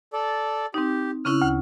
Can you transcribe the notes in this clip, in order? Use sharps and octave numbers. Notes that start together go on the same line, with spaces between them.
A4 D5
C4 D#4 G4
C#3 C#4 E4 F6 F#6
D2